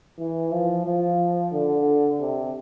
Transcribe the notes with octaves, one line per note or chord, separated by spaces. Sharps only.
E3
F3
F3
D3
C3